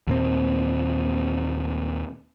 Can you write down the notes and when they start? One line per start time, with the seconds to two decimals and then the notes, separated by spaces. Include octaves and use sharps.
0.07 D#2 A#2 C4